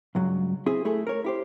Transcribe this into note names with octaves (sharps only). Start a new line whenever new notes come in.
C#2 G2 F#3
C4 E4 G#4
A3 E4 G#4 A4
A#4 C#5
E4 G4 C5